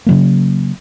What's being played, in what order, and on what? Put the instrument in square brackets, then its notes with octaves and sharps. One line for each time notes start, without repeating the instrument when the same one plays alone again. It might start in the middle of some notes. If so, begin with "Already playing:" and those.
[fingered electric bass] C#3 F#3 A#3